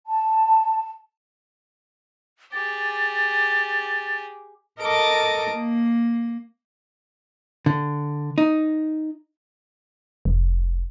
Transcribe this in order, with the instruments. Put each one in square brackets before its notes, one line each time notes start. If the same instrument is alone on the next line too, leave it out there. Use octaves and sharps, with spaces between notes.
[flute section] A5
[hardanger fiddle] G4 G#4 [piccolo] A6
[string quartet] A4 A#4 D#5 A5 D6
A#3
[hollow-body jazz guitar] D3
D#4
[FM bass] F1